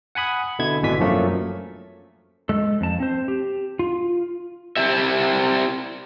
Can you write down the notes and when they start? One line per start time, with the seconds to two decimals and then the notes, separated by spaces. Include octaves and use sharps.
0.15 F#5 G#5 B5 D#6
0.59 B2 D3 E4 G#6
0.83 G#1 B2 D3 E3 G#5 B6
0.99 F#2 F3 F#3 A3 A#3 C#4
2.49 G#3 A4
2.81 F2 A5
3.00 C4 C5
3.28 G4
3.79 F4
4.77 C4 E4 G4 E5